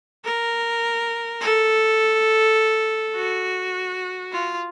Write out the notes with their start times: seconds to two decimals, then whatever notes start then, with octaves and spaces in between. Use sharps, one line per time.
0.25 A#4
1.41 A4
3.15 F#4
4.32 F4